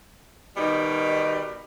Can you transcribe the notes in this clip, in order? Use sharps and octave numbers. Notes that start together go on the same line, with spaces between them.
B2 D#3 G3 D#4